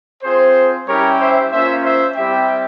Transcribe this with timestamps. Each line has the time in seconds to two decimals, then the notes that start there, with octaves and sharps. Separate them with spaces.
0.23 C4 F4 G#4 C5
0.87 G3 C#4 E4 G4 A#4 C#5
1.21 C5 E5
1.52 A#3 C#4 F4 C5 E5
1.85 C5 E5
2.16 G3 C4 E4 G4 E5 G5